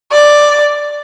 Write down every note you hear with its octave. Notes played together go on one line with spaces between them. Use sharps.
D5